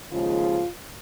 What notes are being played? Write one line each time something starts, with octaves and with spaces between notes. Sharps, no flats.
D#2 C#3 F3 G#3 F4